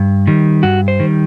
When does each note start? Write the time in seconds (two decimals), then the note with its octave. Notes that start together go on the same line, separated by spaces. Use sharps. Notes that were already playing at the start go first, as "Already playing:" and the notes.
Already playing: G2
0.27 D#3 G3
0.63 G2 F#4
0.88 C5
1.00 D#3 G3